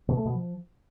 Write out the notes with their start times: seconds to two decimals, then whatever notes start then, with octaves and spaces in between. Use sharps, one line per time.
0.08 B2
0.17 A3
0.25 B2
0.34 F3